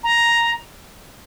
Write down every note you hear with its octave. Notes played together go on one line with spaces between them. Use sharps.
A#5